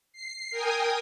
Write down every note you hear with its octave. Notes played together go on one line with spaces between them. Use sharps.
C7
A#4 G5 G#5 D#6